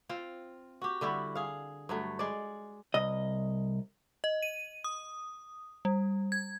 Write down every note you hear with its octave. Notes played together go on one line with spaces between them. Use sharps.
C4 F4
F#4 G4
D3 G3 E4 F#4
G#4 F5
G2 F#3 A3
G#3 D5
C2 D#5
D#5
D#7
D#6
G3
G#6